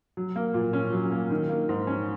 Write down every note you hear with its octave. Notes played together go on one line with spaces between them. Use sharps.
F#3
A#3
A#2
C#4
F#3
A#3
D#3
A#3
G#2
C#4